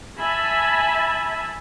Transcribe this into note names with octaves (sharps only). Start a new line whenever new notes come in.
E5 G#5 A5 B5